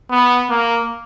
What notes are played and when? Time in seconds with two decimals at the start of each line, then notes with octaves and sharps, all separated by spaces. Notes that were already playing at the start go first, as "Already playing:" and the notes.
0.11 B3
0.50 A#3